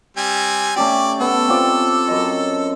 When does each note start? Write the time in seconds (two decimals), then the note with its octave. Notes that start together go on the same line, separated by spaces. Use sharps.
0.17 G3 C4 G#5
0.76 A3 C#4 G4 D5
1.20 B3 A4
1.48 C4 F4 D5
2.08 F#2 D#5